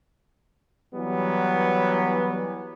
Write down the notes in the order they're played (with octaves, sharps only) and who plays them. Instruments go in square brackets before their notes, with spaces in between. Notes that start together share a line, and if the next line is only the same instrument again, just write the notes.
[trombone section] E3 F#3 G3 B3